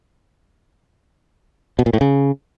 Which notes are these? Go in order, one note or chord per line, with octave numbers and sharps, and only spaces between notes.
B2
A#2
A2
C#3